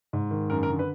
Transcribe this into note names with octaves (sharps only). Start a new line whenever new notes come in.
G#2
D#3
F#2 A#4
A#4
D3
B4